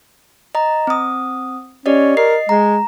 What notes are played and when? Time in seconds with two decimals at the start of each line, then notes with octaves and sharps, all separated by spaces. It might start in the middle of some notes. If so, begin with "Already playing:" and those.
0.55 D#5 A#5
0.87 C4 D#6
1.86 C#4 G4 D5 D#5
2.17 A#4 D#5 C7
2.49 G#3 A#5